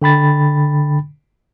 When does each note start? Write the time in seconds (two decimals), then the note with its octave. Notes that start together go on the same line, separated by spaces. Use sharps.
0.02 D3 G5 B5 A6